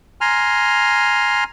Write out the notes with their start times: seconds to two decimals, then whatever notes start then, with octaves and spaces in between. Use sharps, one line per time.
0.21 G#5 A#5 C6 F6